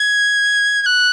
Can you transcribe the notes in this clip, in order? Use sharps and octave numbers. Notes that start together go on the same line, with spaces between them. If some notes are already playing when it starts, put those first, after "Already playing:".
Already playing: G#6
G#6
F#6